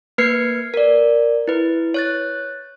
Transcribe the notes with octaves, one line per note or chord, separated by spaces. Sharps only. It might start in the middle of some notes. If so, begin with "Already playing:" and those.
A#3 B4 F6 G#6 C7 C#7
A#4 D5
E4 B4
C#5 F#6 A6